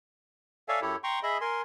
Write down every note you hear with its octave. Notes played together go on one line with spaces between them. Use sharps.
A4 C#5 D5 E5 F5 G#5
F#2 E4 G4 A4 C#5
G5 A#5 C6 C#6
G#4 D#5 E5 B5
A#4 G#5 C6